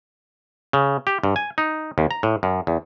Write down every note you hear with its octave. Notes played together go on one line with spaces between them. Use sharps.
C#3
G4
G2
G#5
D#4
D#2
A#5
A2
F#2
E2